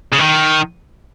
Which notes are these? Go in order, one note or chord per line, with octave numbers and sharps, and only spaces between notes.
C#3
D#3